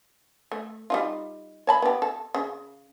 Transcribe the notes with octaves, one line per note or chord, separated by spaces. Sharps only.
A3
G3 D#4 F4
C#5 A5 B5
B3 G4
A4
C#3